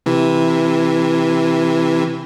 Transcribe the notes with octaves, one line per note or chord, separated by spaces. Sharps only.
C3 E3